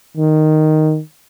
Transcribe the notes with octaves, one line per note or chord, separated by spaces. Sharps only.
D#3